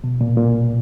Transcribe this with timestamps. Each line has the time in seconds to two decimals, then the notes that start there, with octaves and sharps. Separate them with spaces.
0.04 B2
0.21 A#2
0.37 A#2